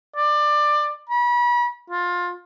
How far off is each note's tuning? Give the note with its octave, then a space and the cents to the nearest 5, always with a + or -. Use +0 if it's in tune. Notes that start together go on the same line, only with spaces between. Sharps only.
D5 +20
B5 -35
F4 +20